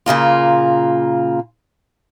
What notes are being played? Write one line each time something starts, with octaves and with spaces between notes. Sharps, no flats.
A#2 C#3 A#3 F4